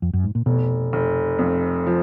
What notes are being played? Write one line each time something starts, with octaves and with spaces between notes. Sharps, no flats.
F2
F#2
G#2
A#2
F1 B2
F1
F2
F3